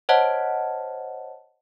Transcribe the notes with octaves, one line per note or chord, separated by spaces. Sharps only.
C5 C#5 D#5 F#5 A5